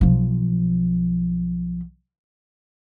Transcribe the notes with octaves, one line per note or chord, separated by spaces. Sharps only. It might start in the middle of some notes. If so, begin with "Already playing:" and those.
B1 F3